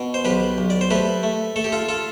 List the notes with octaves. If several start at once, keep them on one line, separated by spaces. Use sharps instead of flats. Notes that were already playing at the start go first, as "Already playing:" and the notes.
Already playing: B2
C5
B1 G4 B4
B1
D5
C5
A3 G4 B4
A3
A3 A4
G4
F4 A4
F4 A4